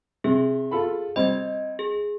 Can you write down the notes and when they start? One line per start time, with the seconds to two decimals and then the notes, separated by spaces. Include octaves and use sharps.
0.24 C3 G#4
0.71 F4 A4 B5
1.16 G3 C4 D#5 G#6
1.79 G#4